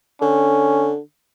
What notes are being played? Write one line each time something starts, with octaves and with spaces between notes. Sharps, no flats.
D3 C#4